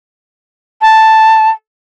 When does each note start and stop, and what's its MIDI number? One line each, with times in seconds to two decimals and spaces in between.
0.82 1.50 81